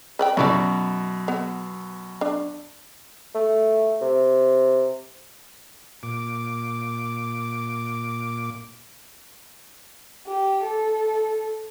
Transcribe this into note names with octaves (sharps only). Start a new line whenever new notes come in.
B4 D5 G5
F#2 B2 C#4 E4 D5
B3
D4
A3
C3
A#2 D6
G4
A4